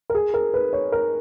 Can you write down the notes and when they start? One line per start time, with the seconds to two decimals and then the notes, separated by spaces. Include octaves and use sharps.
0.10 A#4
0.15 G#4
0.34 A#4
0.54 B4
0.73 C#5
0.92 A#4